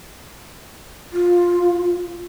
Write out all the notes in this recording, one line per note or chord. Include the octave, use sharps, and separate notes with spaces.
F4